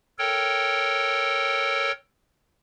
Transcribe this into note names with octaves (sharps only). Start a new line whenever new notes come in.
A4 A#4 C#5 G5